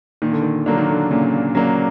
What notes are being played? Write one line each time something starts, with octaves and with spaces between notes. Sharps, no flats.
A#2 D#3
D3
D#3
D3 F#3 A#3 D4
D#3
D3
A#2 C#3
C#3 F#3 A#3 D4